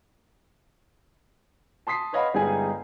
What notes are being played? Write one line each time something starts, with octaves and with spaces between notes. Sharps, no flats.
A5 C6 D#6 B6 C7
B4 C#5 D#5 F5 F#5 B5
G1 G3 G#3 D#4 G#4 G#5